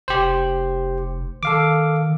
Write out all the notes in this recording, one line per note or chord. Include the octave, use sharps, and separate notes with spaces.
F1 G4 C5
D#3 A4 F5 D6